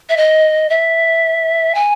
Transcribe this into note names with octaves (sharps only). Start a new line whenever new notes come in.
E5
D#5
E5
G#5